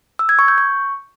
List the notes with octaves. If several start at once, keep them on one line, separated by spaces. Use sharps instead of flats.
E6
G#6
C#6
G6
C#6